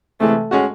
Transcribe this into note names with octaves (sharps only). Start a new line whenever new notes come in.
C3 E3 G#3 A3
G#3 C#4 F#4